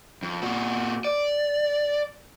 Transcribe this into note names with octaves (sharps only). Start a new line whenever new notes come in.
F2
A#2 F#4
D5